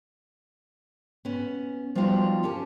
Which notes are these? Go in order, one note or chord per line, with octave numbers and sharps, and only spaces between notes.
B3 C#4
F3 G3 B3 D#4 F4 F#4
C#4 G4 A#4 A5